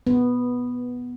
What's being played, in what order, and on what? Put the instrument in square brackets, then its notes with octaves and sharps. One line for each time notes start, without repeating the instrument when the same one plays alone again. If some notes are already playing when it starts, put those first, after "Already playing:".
[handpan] B3